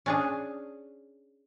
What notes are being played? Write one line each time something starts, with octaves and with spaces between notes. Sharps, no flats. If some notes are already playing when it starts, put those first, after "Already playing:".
C#4 D4 G#4